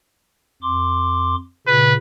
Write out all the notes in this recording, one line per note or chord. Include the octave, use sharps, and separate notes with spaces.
F2 C6 D6
A#2 C#3 B4